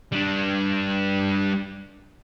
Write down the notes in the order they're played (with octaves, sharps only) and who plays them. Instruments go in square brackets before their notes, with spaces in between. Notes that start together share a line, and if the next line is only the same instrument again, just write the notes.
[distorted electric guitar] G3 D4